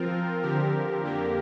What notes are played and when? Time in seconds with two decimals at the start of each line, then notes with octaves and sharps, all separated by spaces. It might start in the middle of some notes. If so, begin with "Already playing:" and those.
Already playing: F3 C4 F4 A#4
0.42 D3 F3 C4 G4 A#4
1.02 F2 D3 A#3 G4 A#4